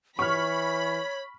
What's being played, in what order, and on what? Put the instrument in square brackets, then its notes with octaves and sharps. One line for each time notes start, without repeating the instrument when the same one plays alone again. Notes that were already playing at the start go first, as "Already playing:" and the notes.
[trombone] E3 [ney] C#5 [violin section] B5 [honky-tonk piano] C#6 F6